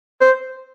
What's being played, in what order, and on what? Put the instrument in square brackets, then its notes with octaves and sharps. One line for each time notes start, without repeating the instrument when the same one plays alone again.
[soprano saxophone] C5